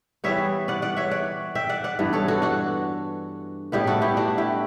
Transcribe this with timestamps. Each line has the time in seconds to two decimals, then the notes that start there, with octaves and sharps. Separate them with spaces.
0.24 E3 G3 B3 C#5 E5
0.68 D5 F#5
0.82 D5 F#5
0.97 C#5 E5
1.11 D5 F#5
1.55 E5 G5
1.69 D5 F#5
1.84 D5 F#5
1.99 G2 E3 B3
2.13 A4 C#5
2.28 F#4 A4
2.42 D4 F#4
3.72 A2 G3 B3 E4 G4
3.87 F#4 A4
4.01 E4 G4
4.17 D4 F#4
4.38 E4 G4